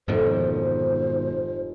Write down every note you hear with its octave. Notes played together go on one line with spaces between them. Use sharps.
F1 G#2 B2 D#3 C5